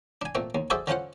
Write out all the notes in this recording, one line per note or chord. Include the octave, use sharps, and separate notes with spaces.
D4 G#5
A#2 A3 C4
D#2
F#4 G#4 A4 C5 D5 E5
D3 C#4 F4 C5 F#5